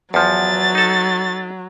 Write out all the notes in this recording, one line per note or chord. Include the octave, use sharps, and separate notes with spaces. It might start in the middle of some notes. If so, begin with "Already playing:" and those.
E2 F3 F#3 A6
D#4 A4